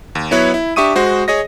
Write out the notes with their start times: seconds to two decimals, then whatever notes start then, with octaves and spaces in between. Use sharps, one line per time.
0.15 D#2
0.31 F#3 B3 E4 B4 C#5
0.54 E4
0.76 D4 G4 E5 C#6 D#6 D#7
0.95 G#3 F#4 C5
1.28 G#4 C#5 D#5 A#6